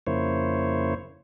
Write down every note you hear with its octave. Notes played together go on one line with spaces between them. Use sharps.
F2 C#3 A#3 E4 C5 C#5